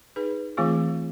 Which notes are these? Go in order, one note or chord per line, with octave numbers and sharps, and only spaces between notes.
D#4 G#4 B4
E3 A3 C4 F4 G#4